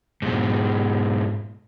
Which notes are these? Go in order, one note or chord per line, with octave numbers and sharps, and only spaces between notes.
G#2 B2